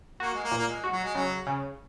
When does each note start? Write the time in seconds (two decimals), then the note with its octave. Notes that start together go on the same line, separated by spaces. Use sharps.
0.20 A#3 F#4
0.34 G#3
0.43 A#3
0.52 A#2
0.57 A#3
0.68 G#3
0.84 F#4
0.90 F#3
1.04 G#3
1.15 C#3 F#3
1.47 C#3